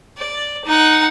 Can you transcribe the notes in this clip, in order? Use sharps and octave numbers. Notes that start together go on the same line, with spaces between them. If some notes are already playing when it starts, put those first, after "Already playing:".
D5
D#4 F#5